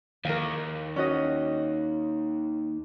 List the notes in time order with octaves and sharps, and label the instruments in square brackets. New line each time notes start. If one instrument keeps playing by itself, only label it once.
[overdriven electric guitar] D#2 [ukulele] A#4 F5
[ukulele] C#4 F#4 D#5